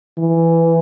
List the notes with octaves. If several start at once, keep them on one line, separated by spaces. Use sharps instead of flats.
E3